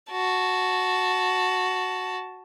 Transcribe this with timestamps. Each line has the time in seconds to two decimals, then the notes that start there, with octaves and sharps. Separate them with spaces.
0.11 F#4 A5